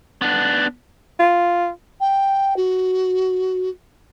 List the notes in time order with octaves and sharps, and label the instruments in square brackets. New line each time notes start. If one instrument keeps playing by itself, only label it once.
[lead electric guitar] B3 D4
[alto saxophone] F4
[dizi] G5
F#4